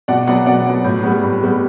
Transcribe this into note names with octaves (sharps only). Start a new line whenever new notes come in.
B2 D5 F#5
F#3 B3 D5 F#5
B2 D5 F#5
F#3 B3
A2
G3 B3
A2
G3 B3